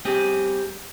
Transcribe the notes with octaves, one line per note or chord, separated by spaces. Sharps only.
G3 C4 G4 G#4